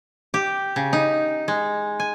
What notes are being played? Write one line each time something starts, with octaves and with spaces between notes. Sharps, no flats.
G4
C#3
D#4
G#3
G#5